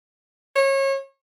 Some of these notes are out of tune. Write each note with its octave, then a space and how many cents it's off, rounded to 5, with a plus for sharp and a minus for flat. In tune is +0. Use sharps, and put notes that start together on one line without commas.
C#5 -30